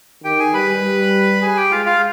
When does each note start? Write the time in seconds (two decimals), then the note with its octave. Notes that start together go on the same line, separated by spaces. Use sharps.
0.24 D#3 G4 G5
0.39 G#4 G#5
0.53 G3 B4 B5
0.83 G3
1.41 G#4 G#5
1.56 G4 G5
1.71 G#3 F4 F5
1.86 F4 F5